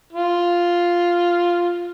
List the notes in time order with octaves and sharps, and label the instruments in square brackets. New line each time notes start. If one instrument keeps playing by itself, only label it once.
[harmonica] F4